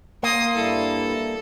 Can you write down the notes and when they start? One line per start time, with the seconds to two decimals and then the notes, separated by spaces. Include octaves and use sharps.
0.23 A#3 C6 D#6
0.55 G2 G3 E4 A4